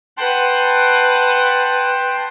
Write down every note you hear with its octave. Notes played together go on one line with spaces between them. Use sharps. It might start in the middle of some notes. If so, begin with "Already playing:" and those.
B4 F#5 G5 A5 C6